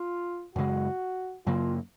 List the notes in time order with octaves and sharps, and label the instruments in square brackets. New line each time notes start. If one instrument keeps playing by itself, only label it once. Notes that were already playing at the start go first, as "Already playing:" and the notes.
Already playing: [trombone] F4
[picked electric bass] F#2 C#3 G#3 [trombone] F#4
[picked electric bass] F#2 C#3 F#3 A#3 [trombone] F4